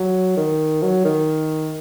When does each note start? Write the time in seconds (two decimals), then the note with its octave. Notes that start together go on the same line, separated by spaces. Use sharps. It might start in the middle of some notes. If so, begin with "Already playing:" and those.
Already playing: F#3
0.37 D#3
0.82 F#3
1.04 D#3